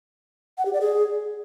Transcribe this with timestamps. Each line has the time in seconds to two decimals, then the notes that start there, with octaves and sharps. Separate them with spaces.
0.58 F#5
0.66 G4
0.73 D5
0.81 G#4